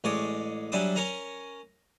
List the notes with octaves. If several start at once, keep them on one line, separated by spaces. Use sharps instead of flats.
A1 G#3 G#4 C#5 D5
F#3 G3 D4 E4 G#5 D#6
C#4 A#4 C#5 G#5 A#5